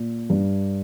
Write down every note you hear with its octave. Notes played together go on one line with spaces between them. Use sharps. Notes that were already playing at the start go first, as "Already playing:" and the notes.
Already playing: A#2
G2